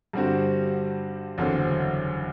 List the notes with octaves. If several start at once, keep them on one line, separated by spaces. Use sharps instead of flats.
G2 D3 G3 C4 F#4
F#1 E2 D3 F#3 C4